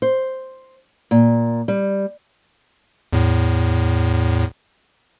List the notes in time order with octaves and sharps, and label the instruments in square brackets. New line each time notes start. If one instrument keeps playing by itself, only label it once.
[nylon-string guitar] C5
A#2
G3
[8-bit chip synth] E2 A2